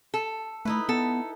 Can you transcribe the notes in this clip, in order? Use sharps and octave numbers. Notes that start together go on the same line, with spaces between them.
A4
A3 D#4 E4 B4
B3 A4